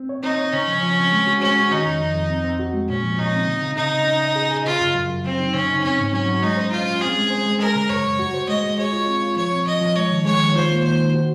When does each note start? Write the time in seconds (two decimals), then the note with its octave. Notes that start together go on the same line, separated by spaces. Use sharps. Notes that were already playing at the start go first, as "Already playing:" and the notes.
Already playing: C4
0.09 C#5
0.23 C4 D#4
0.38 C#5
0.53 C#3 C#4
0.67 F3
0.83 F3
0.97 C4
1.12 G#3
1.27 F#4
1.41 G#3 C#4
1.56 F#4
1.71 D#3 D#4
1.85 F2
2.01 F2
2.15 F2
2.30 C4
2.44 C4
2.59 F#4
2.74 G#3
2.89 A#2 C#4
3.04 F3
3.18 A#2 D#4
3.33 C4
3.47 C#3
3.62 C#3
3.77 C#3 D#4
3.92 C#3
4.07 C#4
4.21 D#5
4.36 G#4
4.51 G#4
4.65 C#3 F4
4.81 F#2
4.95 F#2
5.10 F#2
5.24 F#3 C4
5.39 D#4
5.53 C#3 C#4
5.69 D#4
5.83 C4 C#4
5.99 G#2
6.13 F#3 C#4
6.28 F#3
6.43 G#3 D#4
6.57 C5
6.72 C#4 F4
6.86 C#4
7.01 C4 G#4
7.16 G#3
7.30 C5
7.46 G#3
7.60 G#3 A#4
7.75 C#3
7.90 F#2 C#5
8.04 F#2
8.19 F#4
8.34 C5
8.49 G#3 D#5
8.63 G#3
8.78 G#4 C#5
8.93 F4
9.07 C4
9.22 F4
9.36 F3 C#5
9.52 C4
9.67 F3 D#5
9.81 F3
9.96 G#3 C#5
10.11 D#3
10.25 G#3 C#5
10.41 D#3
10.55 F4 C5
10.70 A#3
10.84 D#3 C5
10.99 D#3
11.14 F#4